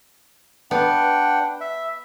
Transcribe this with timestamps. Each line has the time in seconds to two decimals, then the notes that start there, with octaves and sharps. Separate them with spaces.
0.71 B3 D4 F#5 G5
1.61 E5